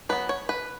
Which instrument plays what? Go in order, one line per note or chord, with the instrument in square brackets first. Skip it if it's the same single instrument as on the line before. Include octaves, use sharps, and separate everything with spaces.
[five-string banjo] F#3 B3 B4
C#5
B4